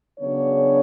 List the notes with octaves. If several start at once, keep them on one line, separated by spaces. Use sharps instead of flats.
C#3 F#3 B3 D4 C#5